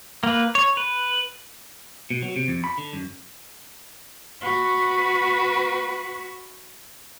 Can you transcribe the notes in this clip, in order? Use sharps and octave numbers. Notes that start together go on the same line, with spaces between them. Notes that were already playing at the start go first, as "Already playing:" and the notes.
A#3 B4
C#5
B4
B2
F#3
C3
F2
B5
D3
F#2
F#4 B4